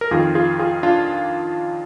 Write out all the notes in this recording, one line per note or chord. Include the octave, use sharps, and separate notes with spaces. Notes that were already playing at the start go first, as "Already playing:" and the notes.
A#4
F2 D#3 F4 G#4
F4 G#4
F4 G#4
D4 F4